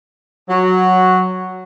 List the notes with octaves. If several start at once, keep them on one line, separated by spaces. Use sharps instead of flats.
F#3